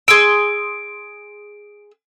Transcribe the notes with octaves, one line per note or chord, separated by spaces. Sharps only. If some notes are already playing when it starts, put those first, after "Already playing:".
G#4 C6 E6 D7